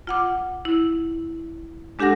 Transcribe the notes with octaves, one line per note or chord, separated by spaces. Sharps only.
F4 F#5 D6
E4
G#3 D4 G4 A4 F#5 A#6